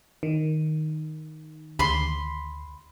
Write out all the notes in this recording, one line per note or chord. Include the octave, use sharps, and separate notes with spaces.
D#3
D2 B5 C6